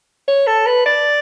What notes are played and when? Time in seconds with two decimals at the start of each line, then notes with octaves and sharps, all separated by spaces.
0.28 C#5
0.47 A4
0.66 B4
0.86 D5